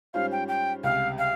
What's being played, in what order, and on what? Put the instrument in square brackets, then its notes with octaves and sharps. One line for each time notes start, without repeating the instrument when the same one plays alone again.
[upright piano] G#2 G3 C#4 F4 C5 [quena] F5
[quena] G5
G5
[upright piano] C#2 C3 G3 [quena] F5
[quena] F5